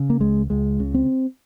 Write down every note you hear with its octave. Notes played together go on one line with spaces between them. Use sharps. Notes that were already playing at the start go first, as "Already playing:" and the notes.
Already playing: C#3
A#3
C#2 G#3
C#2 G#3
C#3
C4